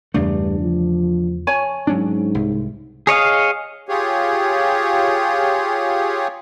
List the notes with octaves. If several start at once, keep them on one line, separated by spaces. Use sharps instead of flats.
E2 G2 C#3 A3 D4
F3
C#5 G#5 A5
G#2 F#3 C#4 D4
C2
G#4 C#5 D#5 F5
F4 G4 G#4 C#5